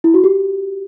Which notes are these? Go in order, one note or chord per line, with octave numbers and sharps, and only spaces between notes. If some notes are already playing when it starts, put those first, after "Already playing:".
E4
F#4
G4